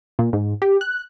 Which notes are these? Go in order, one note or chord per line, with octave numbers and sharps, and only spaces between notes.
A#2
G#2
G4
F#6